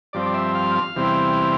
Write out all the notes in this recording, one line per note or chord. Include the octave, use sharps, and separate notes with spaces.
G2 F3 C4 D5
D5
E5
F5
F5
E2 C3 G3 C4 E4